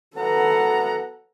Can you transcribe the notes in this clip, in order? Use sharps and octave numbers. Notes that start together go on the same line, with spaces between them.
E3 F#3 B3 A4 F#5 A#5